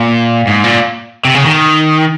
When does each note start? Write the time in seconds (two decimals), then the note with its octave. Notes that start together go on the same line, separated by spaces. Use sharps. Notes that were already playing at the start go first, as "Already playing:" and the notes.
Already playing: A#2
0.47 G#2
0.64 A#2
1.25 C3
1.34 C#3
1.45 D#3